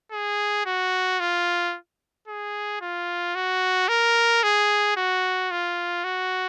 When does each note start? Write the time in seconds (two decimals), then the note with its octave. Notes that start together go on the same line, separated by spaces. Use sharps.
0.12 G#4
0.66 F#4
1.20 F4
2.28 G#4
2.81 F4
3.35 F#4
3.88 A#4
4.43 G#4
4.97 F#4
5.51 F4
6.04 F#4